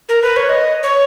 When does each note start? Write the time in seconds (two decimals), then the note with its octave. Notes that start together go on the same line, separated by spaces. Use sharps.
0.09 A#4
0.22 B4
0.36 C#5
0.49 D#5
0.83 C#5